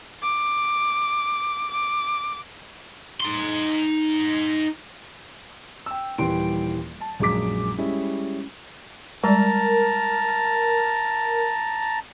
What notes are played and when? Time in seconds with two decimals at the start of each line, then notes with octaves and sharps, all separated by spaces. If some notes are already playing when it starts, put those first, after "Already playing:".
0.22 D6
1.71 D6
3.20 D#4 C6
5.86 G5 E6
6.18 D#1 E3 G3 G5 C6 D7
7.00 A5
7.20 A#1 F#2 G#3 G#4 D6 B6
7.78 G3 G#3 C#4 E4
9.24 G3 G#3 A#4 D5 A5 A#5